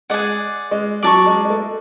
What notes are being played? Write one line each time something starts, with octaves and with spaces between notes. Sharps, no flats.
G#3 G#4 D5 F#5
G#3
F#3 D5 A5 C#6
G#3
G#3
A3